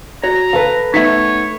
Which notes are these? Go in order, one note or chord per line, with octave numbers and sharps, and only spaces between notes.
F#4 C#5 A#5
A4 B4 F5
A3 B3 D#4 C#5 E5 B6